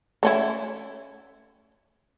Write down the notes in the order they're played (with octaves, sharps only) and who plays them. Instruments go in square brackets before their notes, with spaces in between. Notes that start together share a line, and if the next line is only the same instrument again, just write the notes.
[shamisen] A3 C#4 E4